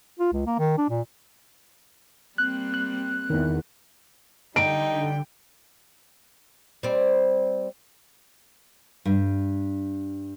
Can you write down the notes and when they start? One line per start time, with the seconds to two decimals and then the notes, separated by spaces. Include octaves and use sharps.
0.19 F4
0.33 C#2
0.46 A#3
0.59 D#3
0.78 D4
0.90 A#2
2.38 G3 A#3 C4 F#6
2.74 F#6
3.30 E2 D#3
4.56 D3 G3 D#4 G5 D7
6.83 G3 C4
9.05 G2